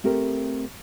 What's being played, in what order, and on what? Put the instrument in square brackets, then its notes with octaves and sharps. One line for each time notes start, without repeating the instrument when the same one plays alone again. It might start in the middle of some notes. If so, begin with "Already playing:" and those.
[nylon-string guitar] A3 C4 G4 A4 A#4